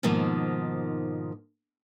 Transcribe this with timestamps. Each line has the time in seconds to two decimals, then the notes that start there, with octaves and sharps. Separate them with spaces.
0.03 G#2 B2 D#3 F3 A#3